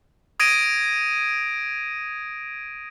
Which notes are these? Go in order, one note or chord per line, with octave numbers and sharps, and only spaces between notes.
D#6 G#6 A#6 D7 D#7